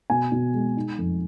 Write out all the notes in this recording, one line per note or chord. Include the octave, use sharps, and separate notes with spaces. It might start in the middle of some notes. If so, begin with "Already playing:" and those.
B2 G#5
B2
G#3
D#4
F2